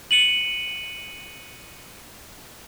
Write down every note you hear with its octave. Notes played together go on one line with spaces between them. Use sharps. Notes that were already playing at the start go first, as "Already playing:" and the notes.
C#7 D#7 F#7